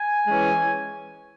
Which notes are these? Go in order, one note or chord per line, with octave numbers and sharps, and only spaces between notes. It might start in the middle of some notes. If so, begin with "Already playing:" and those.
Already playing: G#5
E3 G#3 C#4